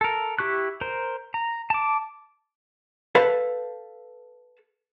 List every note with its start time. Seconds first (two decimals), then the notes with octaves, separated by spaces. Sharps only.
0.01 A4 A#4
0.39 E4 G4 C#6 F#6
0.81 A#4 C5
1.34 A#5
1.70 A5 D6
3.15 A4 B4 F5 A5